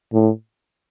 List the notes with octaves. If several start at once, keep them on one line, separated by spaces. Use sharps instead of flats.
A2